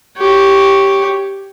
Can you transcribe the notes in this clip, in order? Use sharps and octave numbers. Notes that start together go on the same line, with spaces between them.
G4 C#5